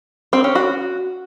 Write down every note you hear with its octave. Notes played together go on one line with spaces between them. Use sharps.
C4
C#4
F#4